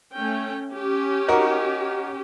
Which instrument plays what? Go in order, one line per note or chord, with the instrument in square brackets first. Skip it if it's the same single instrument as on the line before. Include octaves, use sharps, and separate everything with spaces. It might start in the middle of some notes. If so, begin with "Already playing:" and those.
[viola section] A3 C#4 G5
C#4 G4
[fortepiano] D#4 F#4 A#4